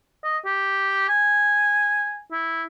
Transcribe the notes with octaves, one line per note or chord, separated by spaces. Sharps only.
D#5
G4
G#5
E4